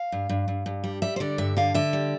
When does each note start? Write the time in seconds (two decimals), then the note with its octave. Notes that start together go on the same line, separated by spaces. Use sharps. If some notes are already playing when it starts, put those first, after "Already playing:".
Already playing: F5
0.12 G2
0.29 G2
0.48 G2
0.66 G2
0.84 G3
1.02 G3 E5
1.16 C5
1.20 D3 D5
1.38 G2 E5
1.57 D3 F5
1.74 D3 E5
1.93 G3